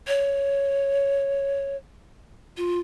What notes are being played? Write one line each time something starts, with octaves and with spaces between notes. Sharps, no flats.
C#5
F4